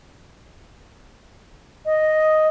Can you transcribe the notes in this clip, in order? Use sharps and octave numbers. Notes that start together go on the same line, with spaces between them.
D#5